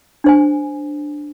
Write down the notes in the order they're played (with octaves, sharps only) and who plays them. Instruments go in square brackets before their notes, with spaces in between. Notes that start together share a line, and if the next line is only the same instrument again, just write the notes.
[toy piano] D4 C5 G#5